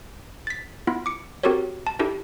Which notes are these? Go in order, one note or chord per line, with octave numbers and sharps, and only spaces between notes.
A6 B6
B3 E4 F4
D6 C#7
C4 F#4 G4 A4 A#4 C#5
A5
D4 E4 G4 A4